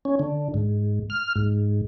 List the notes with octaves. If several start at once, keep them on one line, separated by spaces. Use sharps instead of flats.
C#4
D3
G#2
F6
G#2